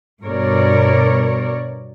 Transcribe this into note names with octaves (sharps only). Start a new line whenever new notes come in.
G2 B2 A#4 C#5 D5